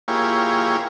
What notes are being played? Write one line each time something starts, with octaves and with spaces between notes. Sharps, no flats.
A#3 E4 F4 G4 G#4 C#5